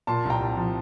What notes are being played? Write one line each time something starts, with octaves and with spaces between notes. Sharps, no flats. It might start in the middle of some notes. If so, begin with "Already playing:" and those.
A#2 A5 C6
C2
G5 A#5
C2
F3